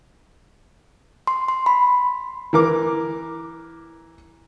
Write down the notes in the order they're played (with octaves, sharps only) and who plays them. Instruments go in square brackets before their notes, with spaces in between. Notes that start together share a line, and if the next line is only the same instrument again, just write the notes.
[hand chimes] C6
C6
B5
[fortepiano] E3 A#4 D6